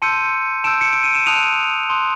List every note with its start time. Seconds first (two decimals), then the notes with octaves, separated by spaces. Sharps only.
0.02 A5 C6 E6 G6 C#7 D#7
0.64 A5 C6 E6 G6 D7 E7
0.81 C#7
0.93 D7
1.04 D#7
1.15 E7
1.26 A5 C6 D#6 F#6 D#7 F7
1.89 A5 C6 D#6 F#6